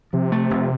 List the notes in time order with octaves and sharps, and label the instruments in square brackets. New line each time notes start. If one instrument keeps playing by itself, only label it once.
[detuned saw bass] C3 [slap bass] F3
[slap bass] A3
F1